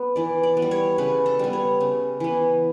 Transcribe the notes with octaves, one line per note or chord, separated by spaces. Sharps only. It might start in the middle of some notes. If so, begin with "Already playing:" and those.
Already playing: B3
E3 D5
D5
B3
G3
C#5
C#3 B4
A4
G3 B3
C#5
C#3
E3 B3